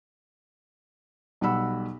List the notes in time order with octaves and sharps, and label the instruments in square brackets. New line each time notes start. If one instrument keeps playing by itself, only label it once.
[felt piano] B1 G3 F#5 B5 E6